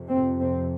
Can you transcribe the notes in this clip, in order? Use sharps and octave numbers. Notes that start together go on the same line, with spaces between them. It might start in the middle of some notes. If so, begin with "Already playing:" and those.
Already playing: F2 C3
C4
C4